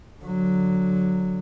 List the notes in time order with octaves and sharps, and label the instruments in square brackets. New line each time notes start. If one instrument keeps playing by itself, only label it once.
[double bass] D3 F#3